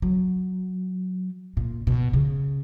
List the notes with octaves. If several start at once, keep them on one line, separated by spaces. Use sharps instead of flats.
F#3
A#2
B2
C#3